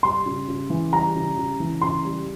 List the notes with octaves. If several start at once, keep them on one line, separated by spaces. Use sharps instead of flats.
G3 C6
C#3
C#3
E3
G3 A#5
C#3
C#3
E3
C#3 C6
G3